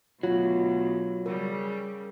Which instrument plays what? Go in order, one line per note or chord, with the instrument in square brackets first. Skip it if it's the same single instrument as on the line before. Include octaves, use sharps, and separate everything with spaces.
[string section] D2 B2 [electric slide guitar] F#3 [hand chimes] F4
[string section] C#3 G3 [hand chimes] A#4